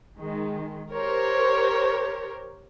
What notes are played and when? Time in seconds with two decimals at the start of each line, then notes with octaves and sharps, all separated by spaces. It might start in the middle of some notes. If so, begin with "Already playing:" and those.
0.18 D#3 G#3
0.93 G4 A#4 C5 C#5